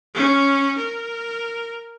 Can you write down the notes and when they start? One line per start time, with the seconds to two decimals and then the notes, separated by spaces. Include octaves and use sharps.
0.15 C#4
0.78 A#4